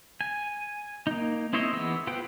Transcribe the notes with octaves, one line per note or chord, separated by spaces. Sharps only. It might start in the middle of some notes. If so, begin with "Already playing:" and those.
G#5
A#3 D#4
C4 E4 C5 C#5 D#5
E3 B3 G#4 E6
B3 F4 B4 C5 G5